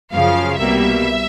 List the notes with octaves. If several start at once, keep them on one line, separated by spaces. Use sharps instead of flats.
F#2 C#3 F3 F5
C2 B2 G3 A#3 E5